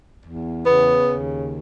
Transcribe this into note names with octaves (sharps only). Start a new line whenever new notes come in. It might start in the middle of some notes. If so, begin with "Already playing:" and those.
E2
C#3 B3
D#2